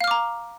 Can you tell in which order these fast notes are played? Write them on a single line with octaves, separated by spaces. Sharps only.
F5 F6 D6 A#5